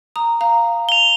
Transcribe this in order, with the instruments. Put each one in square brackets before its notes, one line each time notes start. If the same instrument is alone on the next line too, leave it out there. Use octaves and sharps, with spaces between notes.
[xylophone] A#5 D#6
F5 A#5
[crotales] F7 G7